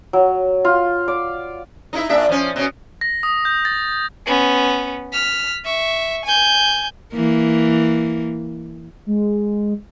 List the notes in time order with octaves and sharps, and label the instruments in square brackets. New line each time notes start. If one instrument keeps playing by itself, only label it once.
[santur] F#3
F4
D5
[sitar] D#4 E4 E5
A#2 D4 E5
F3 C#4
B2 C#4
[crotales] A#6
D#6
G6
A6
[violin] B3 C#4
F6 B6
E5 C#6
G#5 G6
[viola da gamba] E3 A#3
[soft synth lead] G#3